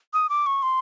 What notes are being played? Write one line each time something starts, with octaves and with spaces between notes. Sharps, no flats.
D#6
D6
C#6
C6